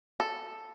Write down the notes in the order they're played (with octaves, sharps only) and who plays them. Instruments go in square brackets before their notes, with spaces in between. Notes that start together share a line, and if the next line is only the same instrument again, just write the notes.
[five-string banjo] A4